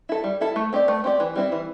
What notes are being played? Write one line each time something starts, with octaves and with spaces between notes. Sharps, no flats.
E4 A4
G3
E4 A4
A3
C4 G4 D5
A3
C4 G4 D5
E3
G3 C4 E4
E3